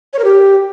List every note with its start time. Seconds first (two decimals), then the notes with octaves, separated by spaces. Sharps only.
0.13 C#5
0.19 A#4
0.24 G4